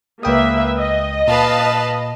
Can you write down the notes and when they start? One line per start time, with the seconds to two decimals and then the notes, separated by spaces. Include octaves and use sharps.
0.23 C#2 A#3 B4 E5 G5 D#6
0.78 D#5
1.27 A#2 B4 F5 A5